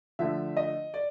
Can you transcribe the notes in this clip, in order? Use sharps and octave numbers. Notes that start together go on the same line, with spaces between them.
D3 F3 A3 E5
D#5
D5